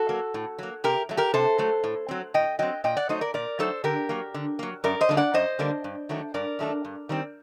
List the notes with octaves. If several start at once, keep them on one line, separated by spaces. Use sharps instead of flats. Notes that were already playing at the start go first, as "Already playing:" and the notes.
Already playing: F#4 A4
F#3 A#3
A2
F#3 A#3
C3 G4 A#4
F#3 A3
G4 A#4
C3 A4 C5
F#3 A3
A2
F#3 C4
A2 D#5 G5
F#3 C4 D#5 G5
A#2 D#5 G5
D5 F#5
F#3 A3 D#4 C5 D#5
A#4 D5
A#2 A#4 D5
F#3 A3 D#4 A4 C5
D3 G4 A#4
F#3 A#3
D3
F#3 A#3
F#2 A#4 D5
C5 D#5
D3 G3 A#3 D4
D5 F#5
F#2 C5 D#5
D3 G3 A#3 D4
G2
D#3 F#3 A3 D4
G2 A#4 D5
D#3 F#3 A3 D4
G2
D#3 G3 C4